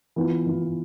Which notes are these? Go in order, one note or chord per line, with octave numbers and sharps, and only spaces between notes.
E3 B3 F4
E3 B3 F4